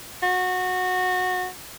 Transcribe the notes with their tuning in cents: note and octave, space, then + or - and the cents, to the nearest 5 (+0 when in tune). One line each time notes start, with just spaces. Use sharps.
F#4 -15